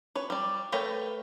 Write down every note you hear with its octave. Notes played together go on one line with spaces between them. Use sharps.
B4 C#5
G3 D5
A3 A#4 B4 C#5 G5